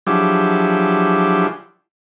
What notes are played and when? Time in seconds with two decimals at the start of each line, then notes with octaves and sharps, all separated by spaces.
0.07 F3 F#3 D4 E4 G4 G#4